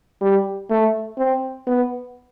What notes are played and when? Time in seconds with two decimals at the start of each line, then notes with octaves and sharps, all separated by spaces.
0.21 G3
0.70 A3
1.18 C4
1.67 B3